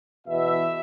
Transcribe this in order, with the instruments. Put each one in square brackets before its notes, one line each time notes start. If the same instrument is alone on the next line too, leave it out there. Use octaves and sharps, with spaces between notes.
[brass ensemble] E2 B2 E5